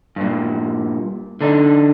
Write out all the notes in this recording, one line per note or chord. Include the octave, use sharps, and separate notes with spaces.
G2 A#2
D3 D4 D#4